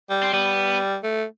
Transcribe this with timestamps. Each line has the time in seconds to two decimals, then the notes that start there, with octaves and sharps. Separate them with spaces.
0.10 G3
0.22 C4
0.33 G3 B3
1.03 A3